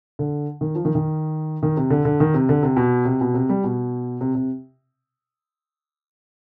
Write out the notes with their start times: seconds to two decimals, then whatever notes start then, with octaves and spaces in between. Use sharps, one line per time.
0.19 D3
0.61 D#3
0.75 F3
0.85 D#3
0.95 D#3
1.63 D#3
1.77 C3
1.90 D3
2.05 D3
2.20 D#3
2.34 C3
2.49 D3
2.63 C3
2.77 B2
3.05 C3
3.21 B2
3.34 C3
3.49 G3
3.64 B2
4.21 C3
4.35 C3